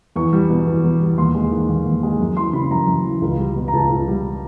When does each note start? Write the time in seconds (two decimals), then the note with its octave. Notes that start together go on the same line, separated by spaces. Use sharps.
0.16 E2 C#6
0.33 G3
0.50 B2
0.66 E2
0.84 E2
1.00 G3
1.18 D#2 C6
1.35 G#3
1.51 D#3
1.69 D#2
1.85 D#2
2.03 G#3
2.20 F#2
2.36 E3 C6
2.53 C#3 B5
2.71 F#2 A#5
2.88 F#2
3.05 E3
3.22 C#2
3.38 G3
3.56 B2
3.68 A#5
3.73 C#2 A5
3.90 C#2
4.08 G3